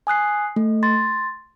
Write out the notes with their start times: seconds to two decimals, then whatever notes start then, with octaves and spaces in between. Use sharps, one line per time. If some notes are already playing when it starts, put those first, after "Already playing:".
0.07 G#5 D#6 F#6 C7
0.56 A3
0.83 C6 A6